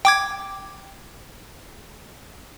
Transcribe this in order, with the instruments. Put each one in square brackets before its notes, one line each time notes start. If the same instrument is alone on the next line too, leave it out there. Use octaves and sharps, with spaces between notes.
[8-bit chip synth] G5 D6 G#6